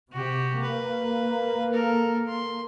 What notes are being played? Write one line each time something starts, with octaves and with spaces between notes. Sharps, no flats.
C3 F#4 G4
A#3 B4
A4 A#4
C6